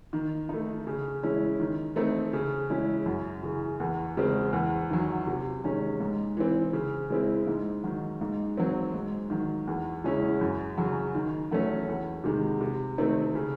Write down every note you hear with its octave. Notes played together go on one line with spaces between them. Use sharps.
D#3
A3 D#4
C#3
G#3 C#4 E4
D#3
A3 C4 D#4
C#3
G#3 C#4 E4
F#2
C#3 E3
E2
C#3 G#3 C4
E2
D#3 F#3
C3
D#3 G#3 C#4
G#2
E3 C4
C#3
G#3 C4 E4
G#2
D#3 F#3
G#2
F#3 C4
G#2
D#3 F#3
E2
C#3 G#3 C#4 E4
F#2
C#3 F#3
D#3
F#3 A3 C#4
E2
C3 D#3 G#3
C3
D#3 A3 C4 D#4
C#3